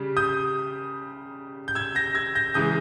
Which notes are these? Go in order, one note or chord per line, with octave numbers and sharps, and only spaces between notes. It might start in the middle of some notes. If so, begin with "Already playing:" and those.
Already playing: C#3 G3
D#6 G6
G6
E6 G#6
G6 A#6
E6 G#6
G6 A#6
C#3 E3 G#3 D#6 G6